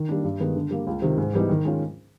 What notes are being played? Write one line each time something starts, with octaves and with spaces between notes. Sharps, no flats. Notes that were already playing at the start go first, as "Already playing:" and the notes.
Already playing: D#3
G3 A#3 D4
G2
D#3 G#3 B3
D3
G3 A#3
C#2
C3 D#3
G#2
E3 G3 B3 D#4
D#3
G#3 C#4 F4